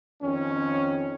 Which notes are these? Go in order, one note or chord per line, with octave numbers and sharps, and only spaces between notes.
F2 D#3 C#4